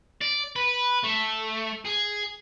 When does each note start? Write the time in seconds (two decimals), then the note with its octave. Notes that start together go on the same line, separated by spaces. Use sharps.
0.22 D5
0.56 B4
1.03 A3
1.85 G#4